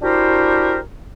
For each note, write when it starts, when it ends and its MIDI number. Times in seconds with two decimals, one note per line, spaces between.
0.02 0.79 62
0.02 0.79 64
0.02 0.79 66
0.02 0.79 67
0.02 0.79 70
0.02 0.79 72